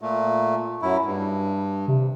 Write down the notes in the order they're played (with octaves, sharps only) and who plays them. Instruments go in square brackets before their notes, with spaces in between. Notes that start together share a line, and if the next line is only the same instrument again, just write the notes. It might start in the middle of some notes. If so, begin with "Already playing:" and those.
[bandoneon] A#2 A3
F#2 E4
G2
[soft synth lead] C3